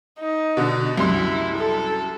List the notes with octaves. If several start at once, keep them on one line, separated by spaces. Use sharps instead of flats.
D#4
B2 D3
C2 F#2 E4 C6
A4